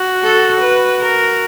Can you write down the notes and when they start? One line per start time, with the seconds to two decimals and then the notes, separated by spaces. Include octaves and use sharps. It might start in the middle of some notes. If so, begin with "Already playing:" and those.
Already playing: F#4
0.23 A4
0.61 B4
1.00 A#4